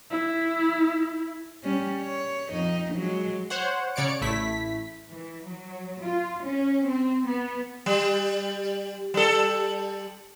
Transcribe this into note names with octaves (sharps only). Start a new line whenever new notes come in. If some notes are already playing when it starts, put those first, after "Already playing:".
E4
G3 C#4
C#5
F2 D#4
F#3 G#3
C5 C#5 F#5
C#3 C#5 D5 C#7 D7
A1 A3 E4 B6
E3
F#3
F4
C#4
C4
B3
G3
G3 A4